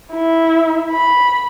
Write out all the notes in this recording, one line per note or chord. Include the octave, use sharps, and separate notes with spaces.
E4
B5